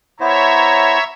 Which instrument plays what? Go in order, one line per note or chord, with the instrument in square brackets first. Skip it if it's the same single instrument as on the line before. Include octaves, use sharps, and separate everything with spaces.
[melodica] B3 E4 C5 [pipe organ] C#5 E5 [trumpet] A#5